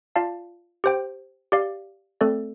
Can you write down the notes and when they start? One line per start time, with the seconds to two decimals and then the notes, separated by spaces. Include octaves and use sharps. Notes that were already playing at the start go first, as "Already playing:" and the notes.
0.16 F4 D5 F5 A5
0.84 G4 C5 G5
1.52 G4 D5 F5
2.21 A3 C4 A4 D5